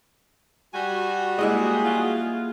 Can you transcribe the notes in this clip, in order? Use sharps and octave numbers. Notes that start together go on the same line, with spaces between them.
G3 F#4 G#5
G#3 A#3 E4 G#4 D#5
F4